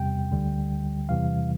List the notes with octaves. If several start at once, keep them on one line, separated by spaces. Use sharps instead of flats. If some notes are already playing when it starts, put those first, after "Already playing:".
Already playing: E2 C3 G3 G5
D2 D3 G3
E2 C3 E3 G3 F5